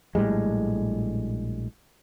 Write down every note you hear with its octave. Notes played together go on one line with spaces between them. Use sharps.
A#1 A2 G3 G#3